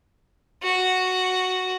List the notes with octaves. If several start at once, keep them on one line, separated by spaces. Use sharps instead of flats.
F#4